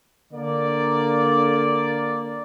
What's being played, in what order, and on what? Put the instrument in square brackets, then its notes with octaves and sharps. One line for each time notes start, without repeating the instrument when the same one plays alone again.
[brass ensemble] D3 A#3 D5